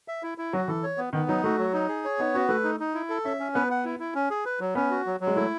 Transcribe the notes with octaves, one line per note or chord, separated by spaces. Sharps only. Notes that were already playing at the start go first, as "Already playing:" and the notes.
E5
E4
E4
F#3 F#4
E3 A4
C#5
B3
D#3 B3
F#3 D#4
A3 F#4
F#3
D#4
G#4
C#5
B3 D#4
C#4 F#4
A3 B4
D#4
D#4
E4
A4
C#4 E5
C#4
B3 B4
F#5
E4
E4
C#4
G#4
B4
F#3
B3 C#4
F#4
F#3
F#3
G#3
A3 E4